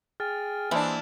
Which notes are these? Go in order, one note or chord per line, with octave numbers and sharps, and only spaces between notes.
G#4 G5 G#5 F6 A6
E3 G3 G#3 A#3 C4 D4